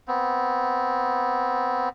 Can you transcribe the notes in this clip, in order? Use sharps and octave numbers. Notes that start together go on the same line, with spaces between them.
B3 C4